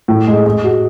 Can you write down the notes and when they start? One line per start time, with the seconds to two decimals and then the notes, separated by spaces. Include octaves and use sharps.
0.08 A2
0.27 G#3
0.46 G#3
0.64 F#4